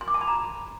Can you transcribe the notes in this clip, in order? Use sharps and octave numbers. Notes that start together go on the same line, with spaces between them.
C6
D6
A5
B5
A#5